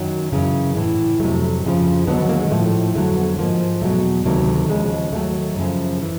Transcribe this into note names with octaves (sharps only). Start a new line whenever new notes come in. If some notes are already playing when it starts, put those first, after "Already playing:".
Already playing: F#2 D#3 F#3
F#2 C#3 E3
A2 E3
F2 C3 D#3 F#3 A3
F2 C#3 F3
D#2 D3 F#3 B3
B3
A#3
G#3
A2 F3 A3
F2 D3 F#3 A3
B3
G#2 F3 A#3
E2 B2 F#3 A3
D2 C3 D#3 F#3 A#3
A3
D#2 C#3 F3 G#3
D#2 D#3 F#3 A3
F#2 C#3 F3
E3